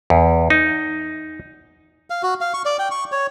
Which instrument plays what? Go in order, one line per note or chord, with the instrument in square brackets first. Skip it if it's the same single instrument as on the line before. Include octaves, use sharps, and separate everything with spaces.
[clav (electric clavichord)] E2
D#4
[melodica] F5
F#4
F5
C#6
D5
G5
C#6
C#5